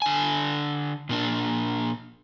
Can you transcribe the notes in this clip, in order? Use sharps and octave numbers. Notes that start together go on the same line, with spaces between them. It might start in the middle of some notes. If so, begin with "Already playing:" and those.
D3 G#5
A#2 A#3 D4